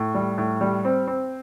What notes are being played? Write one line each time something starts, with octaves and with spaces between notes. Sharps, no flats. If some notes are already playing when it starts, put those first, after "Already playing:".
Already playing: A2
G3
A2
G3
C4
C4